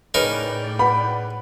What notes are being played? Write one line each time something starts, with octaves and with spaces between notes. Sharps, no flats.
A2 C#3 D#4 A#4 B4 D5 G5
B4 F#5 B5